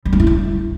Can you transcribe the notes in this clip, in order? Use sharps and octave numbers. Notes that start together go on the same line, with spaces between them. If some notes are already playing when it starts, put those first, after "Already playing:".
G3
D#4
E4
A3